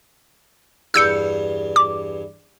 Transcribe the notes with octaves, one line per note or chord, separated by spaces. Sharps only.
E2 G2 E6 G6 C#7
D6